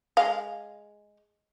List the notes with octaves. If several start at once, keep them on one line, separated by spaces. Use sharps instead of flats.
G#3 F5